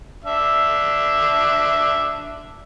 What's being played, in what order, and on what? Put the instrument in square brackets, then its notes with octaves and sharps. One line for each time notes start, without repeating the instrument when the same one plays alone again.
[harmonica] D4 E5